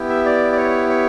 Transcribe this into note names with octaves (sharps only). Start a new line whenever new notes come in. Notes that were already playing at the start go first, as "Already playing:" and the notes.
Already playing: B3 E4 G4
E5
D5
D5
C#5
C#5